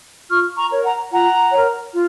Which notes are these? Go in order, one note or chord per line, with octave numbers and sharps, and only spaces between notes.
F4 C#6 F6
A#5 C#6
A#4 C#5
F#5 A#5
F4 F#5 A#5
A#4 C#5
F4